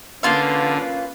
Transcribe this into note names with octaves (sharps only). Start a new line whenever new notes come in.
D3 A#3 C#4 F4 B4 F5